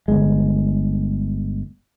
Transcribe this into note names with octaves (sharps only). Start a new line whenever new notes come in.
G1 G#3